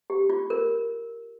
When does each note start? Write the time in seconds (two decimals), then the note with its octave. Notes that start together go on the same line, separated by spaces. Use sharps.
0.10 G4
0.30 F4
0.50 A#4